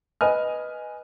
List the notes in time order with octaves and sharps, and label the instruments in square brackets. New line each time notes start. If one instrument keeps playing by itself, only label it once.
[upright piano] B4 D#5 G#5 F6